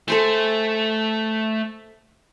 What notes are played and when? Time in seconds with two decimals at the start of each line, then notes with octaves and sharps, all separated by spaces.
0.08 A3 A4 C5 G#5